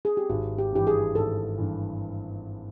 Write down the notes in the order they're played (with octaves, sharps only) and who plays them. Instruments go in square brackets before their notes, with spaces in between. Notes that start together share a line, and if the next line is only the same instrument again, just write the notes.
[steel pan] G#4
G4
[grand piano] G#1 [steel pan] F#4
[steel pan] G4
[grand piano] G2 E3 [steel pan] G4
[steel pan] G#4
[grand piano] G#1 [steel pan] A4
[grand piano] G2 E3